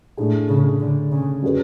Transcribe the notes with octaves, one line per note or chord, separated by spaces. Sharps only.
A2 A3 D4 G#4
C#3
D3
C#3
F#3 C#4 G#4 B4